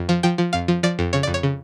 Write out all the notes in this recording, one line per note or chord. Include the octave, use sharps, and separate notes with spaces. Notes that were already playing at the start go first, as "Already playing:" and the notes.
Already playing: F2
F3
F3 G5
F3
F2 F5
F3
F3 D5
F2
C#3 C#5
F2 D5
C#5
C#3